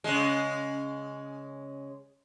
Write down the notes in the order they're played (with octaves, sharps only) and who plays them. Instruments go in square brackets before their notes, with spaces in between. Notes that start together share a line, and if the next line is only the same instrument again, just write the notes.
[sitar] C#3 G#3